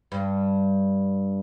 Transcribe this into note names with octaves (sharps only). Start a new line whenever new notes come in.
G2